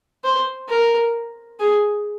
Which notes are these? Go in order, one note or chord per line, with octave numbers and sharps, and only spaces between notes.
C5
A#4
G#4